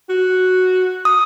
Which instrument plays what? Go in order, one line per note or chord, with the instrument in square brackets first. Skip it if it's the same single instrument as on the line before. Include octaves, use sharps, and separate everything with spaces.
[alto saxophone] F#4
[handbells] D#6